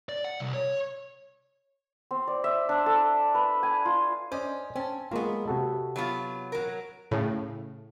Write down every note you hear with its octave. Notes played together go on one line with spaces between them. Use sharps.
D5
F#5
C2
C#5
C4
D5
E5
D4
A4
B4
G#5
F4
C#4 C5 D5 D#5
C4 C#4 A5
F#3 G#3 A#3 B3 F4
C3 F#4 A4
F#3 B3 F4
F#3 A#4
A2 C#3